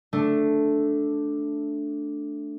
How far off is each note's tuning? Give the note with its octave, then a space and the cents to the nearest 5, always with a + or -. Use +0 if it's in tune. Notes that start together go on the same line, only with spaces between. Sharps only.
A3 +0 D4 +0